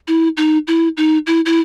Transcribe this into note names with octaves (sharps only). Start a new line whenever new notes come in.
E4
D#4
E4
D#4
E4
E4